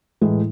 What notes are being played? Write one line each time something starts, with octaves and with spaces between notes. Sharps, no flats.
A2 E3 G#3